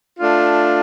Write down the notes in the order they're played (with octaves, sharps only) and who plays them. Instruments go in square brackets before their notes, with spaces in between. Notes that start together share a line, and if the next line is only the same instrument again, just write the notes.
[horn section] A3 D4 F4